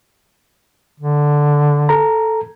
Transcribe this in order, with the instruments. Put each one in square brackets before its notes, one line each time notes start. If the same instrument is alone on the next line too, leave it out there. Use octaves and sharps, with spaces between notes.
[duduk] D3
[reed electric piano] A4 A#5